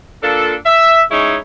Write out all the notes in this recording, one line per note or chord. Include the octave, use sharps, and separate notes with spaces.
A#2 D4 F4 A4
E5
G#3 C#4 D#4 E4 C#5